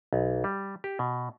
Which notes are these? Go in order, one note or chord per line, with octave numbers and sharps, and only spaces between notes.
B1
G3
G4
B2